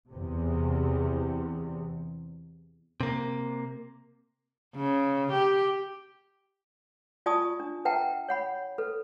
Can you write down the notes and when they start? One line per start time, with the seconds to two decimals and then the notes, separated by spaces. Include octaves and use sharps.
0.11 E2 C3
3.01 C3 A#3
4.76 C#3
5.32 G4
7.26 F4 D5 G#5 A5 C#6 D#6
7.60 D4
7.85 B4 E5 F#5 G5 A5 A#5
8.29 C#5 F#5 B5
8.78 A4 B4